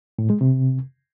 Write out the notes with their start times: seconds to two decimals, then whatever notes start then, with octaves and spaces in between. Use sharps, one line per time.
0.19 A2
0.30 G#3
0.41 C3